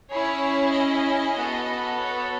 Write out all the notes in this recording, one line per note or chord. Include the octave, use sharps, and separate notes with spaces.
C#4 E4 G#4 C#5
D#5
B3 F#4 A4
C#5